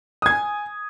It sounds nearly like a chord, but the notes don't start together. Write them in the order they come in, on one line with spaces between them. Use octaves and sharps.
D#6 G#6 G#5